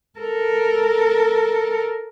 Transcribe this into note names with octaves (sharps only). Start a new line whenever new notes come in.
A4 A#4